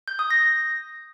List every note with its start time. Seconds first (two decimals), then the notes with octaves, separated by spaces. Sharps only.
0.08 G6
0.19 D#6
0.31 A#6